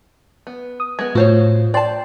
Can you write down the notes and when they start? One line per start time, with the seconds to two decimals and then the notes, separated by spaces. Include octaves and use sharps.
0.47 B3
0.80 D#6
0.99 G#3 B3 G#6
1.15 A2 F4 F#4 C5 C#5
1.74 D5 G5 A5 C6